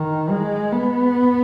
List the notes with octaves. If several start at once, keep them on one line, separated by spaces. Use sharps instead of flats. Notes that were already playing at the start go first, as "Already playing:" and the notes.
Already playing: D#3
G#3
B3